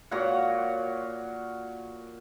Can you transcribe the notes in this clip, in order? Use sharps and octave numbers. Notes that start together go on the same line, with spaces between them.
A#2 F#4 C#5 F#5